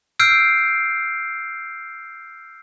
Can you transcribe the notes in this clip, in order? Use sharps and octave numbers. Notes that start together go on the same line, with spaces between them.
E6 F6 G6 C7 D7